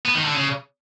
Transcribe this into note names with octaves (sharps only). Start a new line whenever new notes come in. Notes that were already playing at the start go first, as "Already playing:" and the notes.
B3
D#3
D3
C#3